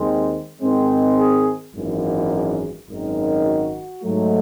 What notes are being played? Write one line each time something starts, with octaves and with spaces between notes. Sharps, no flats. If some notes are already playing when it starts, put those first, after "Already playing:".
Already playing: D#2 D#3 G#3 C4
G#2 D#3 G#3 C4
G#4
G#1 F#2 E3
G#4
G#1 F#2 D#3
F#4
G#2 F#3 A3